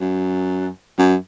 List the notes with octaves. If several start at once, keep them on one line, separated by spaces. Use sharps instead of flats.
F#2
F#2